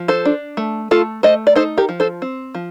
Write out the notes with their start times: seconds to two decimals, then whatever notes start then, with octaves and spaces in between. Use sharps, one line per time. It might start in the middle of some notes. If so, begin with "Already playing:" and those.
Already playing: F3
0.08 A4 C5
0.25 D4
0.57 A3
0.91 A3 F4 A4
1.23 A3 C5 D#5
1.47 D5
1.56 D#4 A4 C5
1.78 G4 A#4
1.89 F3
2.00 A4 C5
2.22 C4
2.55 F3